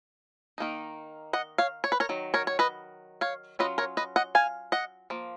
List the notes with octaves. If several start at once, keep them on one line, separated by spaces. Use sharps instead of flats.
D#3 A#3 D#4
D#5 F#5
C#5 F5
C#5
B4
A#4 C#5
D#3 F#3
A#4 C#5
C#5
B4 D#5
C#5 F5
F#3 C#4 F4 B4 D#5
A#4 C#5
B4 D#5
D#5 F#5
F5 G#5
D#5 F#5
F3 A#3